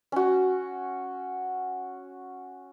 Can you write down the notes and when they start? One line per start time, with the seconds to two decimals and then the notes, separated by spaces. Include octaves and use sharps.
0.12 C#4 F#4